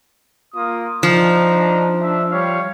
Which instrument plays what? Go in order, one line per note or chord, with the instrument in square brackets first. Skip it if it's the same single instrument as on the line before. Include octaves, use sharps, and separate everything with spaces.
[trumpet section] A#3 F4 D#6
[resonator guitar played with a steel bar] F3 [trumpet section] D4 D#4 A#5
[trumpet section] D4 E5
G3 C#5 F5